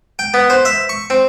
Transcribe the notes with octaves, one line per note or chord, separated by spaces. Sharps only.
G5
B3
C5
E5
C#6
C4